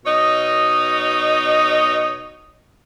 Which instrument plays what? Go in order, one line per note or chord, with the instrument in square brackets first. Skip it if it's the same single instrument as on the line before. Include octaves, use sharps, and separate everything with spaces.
[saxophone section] B2 D#4 C#5 D#5